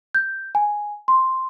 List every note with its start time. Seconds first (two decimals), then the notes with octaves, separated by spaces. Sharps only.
0.15 G6
0.55 G#5
1.08 C6